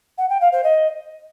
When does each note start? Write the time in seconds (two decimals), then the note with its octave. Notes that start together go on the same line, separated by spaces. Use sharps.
0.18 F#5
0.29 G5
0.41 F5
0.52 C5
0.64 D#5